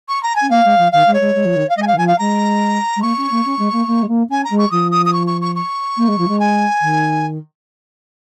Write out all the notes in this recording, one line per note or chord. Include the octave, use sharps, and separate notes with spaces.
C#6
A#5
G#5
C#4
A#3 F5
G#3
F3
D#3 F5
G#3
C#5
G#3
G#3
F3
D#3
F5
G#3 D#5
G#5
F5
D#3
F3 G#5
F5
G#3 A#5
G#3
A#3 C#6
C#4
A#3
C#4
G#3
A#3
A#3
G#3
A#3
C#4 G#5
A#5
G#3
C#6
F3 D#6
D#6
D#6
C#6
C#6
C#6
C#6
A#3
G#3
F3
G#3
G#5
D#3